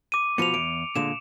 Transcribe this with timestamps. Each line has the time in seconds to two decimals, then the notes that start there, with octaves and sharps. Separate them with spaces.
0.12 D6 D#7
0.38 B2 F3 B3 C#7 F7
0.54 E2 D7
0.96 A#2 D3 G#3 E7